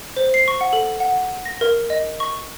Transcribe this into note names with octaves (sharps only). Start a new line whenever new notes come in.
C5
C7
C#6
F#5
A4
F#5
A#6
A#4
D#5
C#6